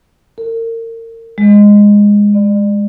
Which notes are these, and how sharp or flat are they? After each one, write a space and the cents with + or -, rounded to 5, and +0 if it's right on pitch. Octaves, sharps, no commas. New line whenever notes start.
A#4 -35
G#3 -15
D5 +35